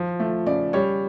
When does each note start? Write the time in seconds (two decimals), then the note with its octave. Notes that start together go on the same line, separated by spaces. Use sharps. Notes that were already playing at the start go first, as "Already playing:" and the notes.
Already playing: F3
0.20 A3
0.46 C#3 D5
0.73 G3 C#5